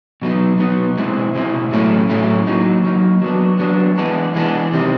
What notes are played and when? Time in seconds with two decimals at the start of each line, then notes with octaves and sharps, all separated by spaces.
0.22 B2 F#3 B3 D#4
0.59 B2 F#3 B3 D#4
0.97 B2 G#3 C4 E4
1.35 B2 G#3 C4 E4
1.72 A2 F#3 A3 C#4 E4
2.09 A2 F#3 A3 C#4 E4
2.47 F#3 A#3 D#4
2.84 F#3 A#3 D#4
3.22 F#3 B3 D4
3.59 F#3 B3 D4
3.98 E3 G#3 B3 D4
4.35 E3 G#3 B3 D4
4.73 C3 D#3 G3 C4